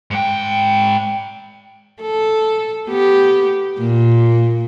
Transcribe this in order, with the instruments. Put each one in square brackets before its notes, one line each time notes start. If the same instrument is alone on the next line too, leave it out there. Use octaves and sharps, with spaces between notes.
[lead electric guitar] G#2 G5
[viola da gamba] A4
B3 G4
A#2